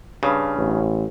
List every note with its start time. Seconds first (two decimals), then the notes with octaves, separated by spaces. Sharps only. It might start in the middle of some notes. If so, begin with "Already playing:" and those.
0.23 G2 C#3
0.56 A1